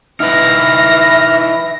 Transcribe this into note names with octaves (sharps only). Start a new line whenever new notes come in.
D#4 E4 B4 E5 F6 A#6